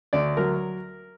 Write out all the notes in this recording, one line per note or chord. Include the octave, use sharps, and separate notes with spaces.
D2 D5
F#3 A#4